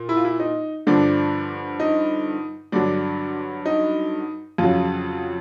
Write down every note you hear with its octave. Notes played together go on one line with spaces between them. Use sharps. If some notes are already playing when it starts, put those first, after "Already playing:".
Already playing: A#2
E4
F4
E4
D#4
G2 D3 F3 D4
D#4
G2 D3 F#3 D4
D#4
F2 C#3 F#3 F4